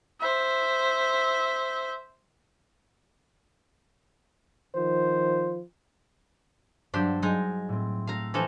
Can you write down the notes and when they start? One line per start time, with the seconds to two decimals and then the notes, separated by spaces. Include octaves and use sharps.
0.21 C5 E5
4.74 D#3 F3 F4 C5
6.94 G2 F#3 D4 G4 C5
7.22 F#3 G#3 D#4 A6 D#7
7.69 A2 C4
8.07 A3 F5 A#5
8.34 E3 F3 A4 A#6